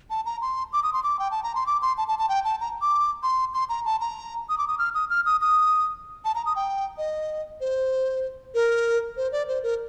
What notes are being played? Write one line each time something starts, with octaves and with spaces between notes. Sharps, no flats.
A5
A#5
C6
D6
D#6
C6
D6
G5
A5
A#5
C6
D6
C6
A5
A5
A5
G5
A5
A#5
D6
C6
C6
A#5
A5
A#5
D#6
D6
D#6
F6
D#6
F6
D#6
D#6
A5
A#5
D#6
G5
D#5
C5
A#4
C5
D5
C5
A#4